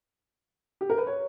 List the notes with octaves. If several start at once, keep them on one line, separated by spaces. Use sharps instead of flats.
G4
A#4
B4
C#5